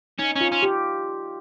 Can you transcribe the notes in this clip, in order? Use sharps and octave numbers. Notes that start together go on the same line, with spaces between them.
C#4 D#4
C#4
F4
C#4
G4